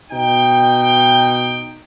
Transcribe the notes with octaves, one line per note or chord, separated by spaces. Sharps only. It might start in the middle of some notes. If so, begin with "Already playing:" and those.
B2 D#4 G5